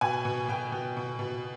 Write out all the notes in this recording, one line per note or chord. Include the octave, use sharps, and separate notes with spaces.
B2 G#5
B2
B2 G5
B2
B2
B2